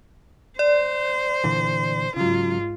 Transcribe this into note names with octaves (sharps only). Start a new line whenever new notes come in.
C5 D5
A#2 D3 E3
G#2 C#3 F#3 F4